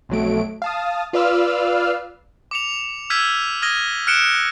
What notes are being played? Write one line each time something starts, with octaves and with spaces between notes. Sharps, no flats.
B1 F2 F#3 A3 D7
F5 A5 D#6
F4 B4 D5 F5 E6 F6
D6 C#7 F7
E6 F6 G6 G#6 B6 D#7
D#6 F6 G#6 A#6 D#7 G7
F6 F#6 C#7 D7 E7 G7